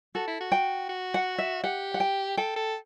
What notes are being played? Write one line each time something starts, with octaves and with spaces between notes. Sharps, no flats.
F#4 A4
E4
F#4
G5
F#4
F#5
E5
G4 F#5
F#5
G5
A4 G5
A4